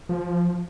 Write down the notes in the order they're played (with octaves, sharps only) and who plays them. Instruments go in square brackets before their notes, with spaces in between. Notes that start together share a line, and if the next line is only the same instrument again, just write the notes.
[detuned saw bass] F3